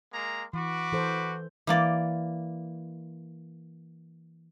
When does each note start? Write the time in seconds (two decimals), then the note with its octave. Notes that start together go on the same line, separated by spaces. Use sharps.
0.13 G#3 A#3 A#5
0.53 E3 F#4 B5 D6
0.92 E3 A4 C5
1.67 E3 A#3 D5